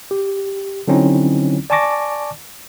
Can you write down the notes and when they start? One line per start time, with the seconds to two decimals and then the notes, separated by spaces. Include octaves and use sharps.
0.11 G4
0.88 D3 F#3 C4 C#4 D#4 E4
1.70 D5 G#5 A5 C#6 D6 A#6